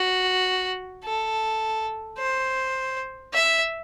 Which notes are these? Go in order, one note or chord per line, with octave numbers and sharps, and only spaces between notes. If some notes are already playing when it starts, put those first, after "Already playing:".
Already playing: F#4
A4
C5
E5